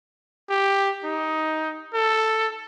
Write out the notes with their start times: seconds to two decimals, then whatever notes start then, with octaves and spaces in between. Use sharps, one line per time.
0.50 G4
1.04 D#4
1.94 A4